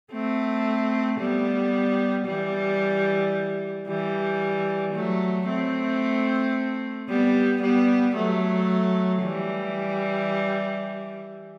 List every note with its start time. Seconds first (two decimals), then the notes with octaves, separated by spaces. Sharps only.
0.13 A3 C4
1.20 G3 B3
2.27 E3 G3
3.87 E3 G3
4.94 F#3 A3
5.48 A3 C4
7.09 G3 B3
7.62 G3 B3
8.16 F#3 A3
9.22 E3 G3